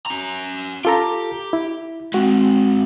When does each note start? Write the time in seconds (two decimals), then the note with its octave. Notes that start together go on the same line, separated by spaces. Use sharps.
0.06 C#4 A#5
0.85 F4 G4 A4 A#5
1.53 E4
2.14 G#3 C4 F#4